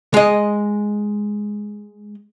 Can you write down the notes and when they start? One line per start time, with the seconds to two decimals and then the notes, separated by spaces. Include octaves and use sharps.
0.14 G#3 D#5